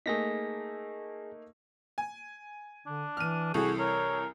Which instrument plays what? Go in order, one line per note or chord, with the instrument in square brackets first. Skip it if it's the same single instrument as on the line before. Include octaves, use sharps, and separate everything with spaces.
[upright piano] A3 A#3 D#4 [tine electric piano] G#4 A#6 B6
[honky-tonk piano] G#5
[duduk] D3 [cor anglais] D4
[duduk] E3 [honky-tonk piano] F6 D#7
[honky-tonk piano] C2 E3 A4 [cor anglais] F#4 [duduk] G#4
[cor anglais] A#4 [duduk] C#5